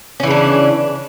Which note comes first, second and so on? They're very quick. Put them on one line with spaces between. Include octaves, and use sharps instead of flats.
C#4 E3 C#3 D4